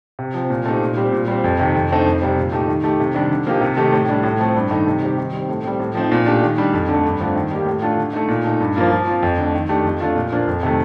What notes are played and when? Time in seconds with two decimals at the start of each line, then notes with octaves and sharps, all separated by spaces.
0.19 C3
0.34 F3 C4
0.50 A#2
0.66 A3 C4 D#4 G4
0.81 A#2
0.97 G3 C4 G4
1.12 A#2
1.28 G3 C4
1.44 F2
1.59 C3 D#3
1.75 F2
1.90 D3 A3 C4 D#4
2.06 F2
2.22 C3 G3 C4
2.37 A#2
2.52 A3 D#4 G4
2.68 D#3
2.84 A3 D#4 G4
3.00 C3
3.14 D#3 G3 D4
3.30 D3
3.46 F3 A#3 D#4 G4
3.61 C3
3.77 D#3 A3 D#4 G4
3.93 A2
4.09 G3 D4
4.23 A2
4.39 F3 A3 C4
4.56 G2
4.71 D#3 A3 D#4
4.87 C3
5.02 D#3 G3 C4 G4
5.18 D#3
5.33 G3 C4
5.49 A2
5.64 G3 C4
5.80 A2
5.95 F3 C4 D#4
6.12 A#2
6.26 A3 D4 G4
6.43 D#3
6.58 G3 D4 G4
6.73 F2
6.89 D3
6.94 A3
7.04 G2
7.20 D3 A3 C4 F4
7.35 D#3
7.51 G3 A#3 D#4 G4
7.66 A2
7.82 A3 D4 F4
7.97 D3
8.13 A3 D#4
8.28 A#2
8.44 A3 D#4
8.60 G2
8.76 F3 A#3 F4
8.91 F3
9.08 C4 F4
9.23 F2
9.38 D3 A3
9.53 D#3
9.69 A3 D4 G4
9.84 F2
10.00 D3 A3 D4 F4
10.15 A#2
10.32 F3 A#3 D4 F4
10.47 F2
10.63 C3 D#3 A3